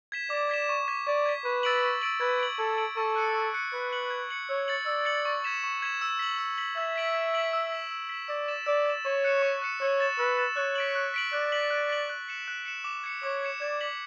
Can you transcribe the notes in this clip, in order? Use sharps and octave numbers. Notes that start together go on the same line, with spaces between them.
G#6 B6 E7
D5 D6
G#6 B6 E7
C#6
G#6 B6
D5 C#6
G#6 B6
B4 C#6
E6 A6 D7 F#7
C#6
E6 A6 D7 F#7
B4 G#6
D7 F#7
A4 G#6
D7 F#7
A4 C#6
F#6 C#7
C#6
F#6 C#7
B4 G#6
C#7 F#7
G#6
C#7 F#7
C#5 E6
A6 C#7 F#7
D5 E6
A6 C#7 F#7
C#6
G#6 B6 E7
C#6
G#6 B6 E7
E6
B6 F#7
E6
B6 F#7
E5 G#6
B6 D7 F#7
G#6
B6 D7 F#7
E6
B6 E7
E6
B6 E7
D5 E6
A6 E7
D5 E6
A6 E7
C#5 C#6
F#6 C#7 E7
C#6
F#6 C#7 E7
C#5 E6
A6 E7
B4 E6
A6 E7
C#5 F#6
B6 D7 F#7
F#6
B6 D7 F#7
D5 F#6
B6 F#7
F#6
B6 F#7
F#6
C#7 E7
F#6
C#7 E7
D6
G#6 C#7 E7
C#5 D6
G#6 C#7 E7
D5 G#6
B6 F#7